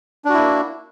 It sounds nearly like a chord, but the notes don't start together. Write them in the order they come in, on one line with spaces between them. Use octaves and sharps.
D4 F#4 E4 A#3